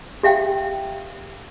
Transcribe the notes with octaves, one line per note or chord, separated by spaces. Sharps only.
G4 E5 F5 G5